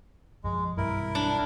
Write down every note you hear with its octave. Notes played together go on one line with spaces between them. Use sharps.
B1 F#2 F3 G#3
B1 G2 G3 E4 A#4
D4